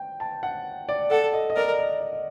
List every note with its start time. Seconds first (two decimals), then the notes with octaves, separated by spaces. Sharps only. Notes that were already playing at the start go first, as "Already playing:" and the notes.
Already playing: G5
0.20 A5
0.43 F#5
0.89 D5
1.11 A4 F#5
1.33 D#5
1.50 D#5
1.56 A#4 D5
1.79 D#5
2.01 D5
2.13 D#5